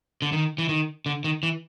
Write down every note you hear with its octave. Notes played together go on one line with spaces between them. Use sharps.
D3
D#3
E3
D#3
D3
D#3
E3